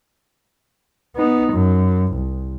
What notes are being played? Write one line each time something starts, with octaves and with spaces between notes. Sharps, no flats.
B3 D#4
F#2
C2